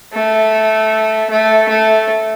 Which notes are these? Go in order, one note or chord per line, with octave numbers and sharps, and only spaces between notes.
A3
A3
A3